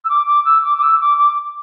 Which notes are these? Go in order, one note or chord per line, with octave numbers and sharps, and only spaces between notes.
E6
D6
D6
E6
D6
D6
E6
D6
D6